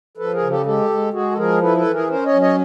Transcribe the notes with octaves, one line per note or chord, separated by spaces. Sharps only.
F3 A4 B4
G#4 A#4
C#3
G4 A4
G#3 G4 A4
G#3
G#3 F#4 G#4
A4
F3 G#4 A#4
E4 A4 B4
A4 B4
E3
G#4 A#4
C#4 A#4 C5
C#5 D#5
F#3
C#5 D#5